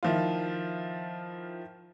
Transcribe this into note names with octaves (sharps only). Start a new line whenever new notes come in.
D#3 F3 E4 F4